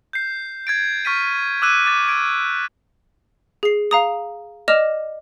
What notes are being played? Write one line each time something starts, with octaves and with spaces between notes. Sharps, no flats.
G6 C7
G#6 A6 D7
C#6 F6 A6 B6 C7 D#7
D6 E6 F#6 D#7
D6 G#6 A6 D#7
G#6 D7
G#4 C7
F5 A#5 D#6
D5 D#5 D6 F6 E7 F7